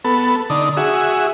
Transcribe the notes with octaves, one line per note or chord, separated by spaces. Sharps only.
B3 A4
D3 D#4
F#4 G#4 E5